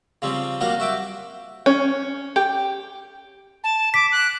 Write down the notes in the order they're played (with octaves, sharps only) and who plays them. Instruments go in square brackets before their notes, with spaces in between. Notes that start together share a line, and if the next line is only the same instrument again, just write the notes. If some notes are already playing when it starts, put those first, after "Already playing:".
[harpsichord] C#3 F3 G3 C4 C#4
F#3 G3 A#3 F#4 A#4 F5
F#4 E5 G5 D6
[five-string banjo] C#4
G4
[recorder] A5
[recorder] D6 [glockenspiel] B6
[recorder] F#6